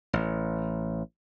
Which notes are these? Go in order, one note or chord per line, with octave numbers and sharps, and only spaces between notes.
A1